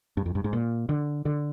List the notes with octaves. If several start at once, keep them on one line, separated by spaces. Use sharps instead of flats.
G2
F2
G2
G#2
A#2
D3
D3